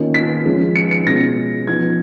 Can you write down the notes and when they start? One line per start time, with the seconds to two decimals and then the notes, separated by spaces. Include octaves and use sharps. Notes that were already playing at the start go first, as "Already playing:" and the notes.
Already playing: D#3 A#3 C#4 F4
0.14 B6
0.45 F3 G#3 C#4 F4
0.76 C#7
0.91 C#7
1.06 B2 G#3 C#4 F4 A#6
1.67 F3 B3 D#4 G#6